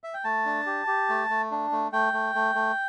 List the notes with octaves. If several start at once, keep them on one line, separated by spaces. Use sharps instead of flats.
E5
G5
A3 A5
D4
G4
G4
A3
A3
D4
A3
A3 G5
A3
A3
A3